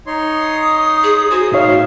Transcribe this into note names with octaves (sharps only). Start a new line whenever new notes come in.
D#4 C#5 C6
D#6
G#4
F#4 G#4 C5 G#5
A2 D#4 C5 C#5 E5 F5